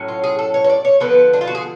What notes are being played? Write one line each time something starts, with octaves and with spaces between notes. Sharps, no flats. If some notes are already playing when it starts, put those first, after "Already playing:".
Already playing: A2 F#3 C#4
F4
G#4
A4
C#5
C#5
D5
C#5
D3 F3 B3 B4
D4
F4
F#4
G#4